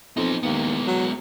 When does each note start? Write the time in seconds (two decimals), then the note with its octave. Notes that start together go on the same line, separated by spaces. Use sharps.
0.17 F2 B3 D#4
0.43 D#2 G#3 B3
0.87 F#3